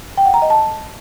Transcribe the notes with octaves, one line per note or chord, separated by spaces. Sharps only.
G5
F#5
A#5
D#5
A5